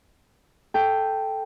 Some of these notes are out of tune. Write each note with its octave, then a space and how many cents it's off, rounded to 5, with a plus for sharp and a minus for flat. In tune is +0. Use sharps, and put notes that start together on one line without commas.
A4 +0 G5 +0